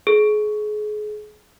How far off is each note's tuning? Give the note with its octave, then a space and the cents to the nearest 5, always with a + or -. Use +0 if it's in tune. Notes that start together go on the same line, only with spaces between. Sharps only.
G#4 +30